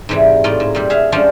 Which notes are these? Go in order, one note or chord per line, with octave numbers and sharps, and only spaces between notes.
G#2 C3 E3 G3
A2 D#4 F4 D5
G#2
A#2 G3
G#4 E5 F5
F3 G3 G#3 C#4 D4 F4